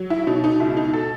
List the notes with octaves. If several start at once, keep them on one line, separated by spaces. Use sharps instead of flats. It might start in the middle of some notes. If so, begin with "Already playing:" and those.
Already playing: F#3
E4
B2 D#4
D#4
C#2 E4
D#4
A4